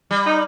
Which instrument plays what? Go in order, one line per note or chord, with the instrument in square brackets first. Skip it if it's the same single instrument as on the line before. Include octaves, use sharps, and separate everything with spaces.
[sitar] G3
[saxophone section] D#4